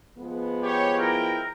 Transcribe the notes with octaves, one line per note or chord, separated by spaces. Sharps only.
F3 G#3 B3
G4 C#5
E4 A#4 G5